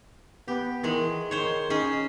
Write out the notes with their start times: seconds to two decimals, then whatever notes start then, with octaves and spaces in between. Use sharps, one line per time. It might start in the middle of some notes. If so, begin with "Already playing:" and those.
0.48 B3 G4
0.83 D#3 E3 G#3
1.31 D#3 C5 C#5
1.70 C#4 D#4 G#4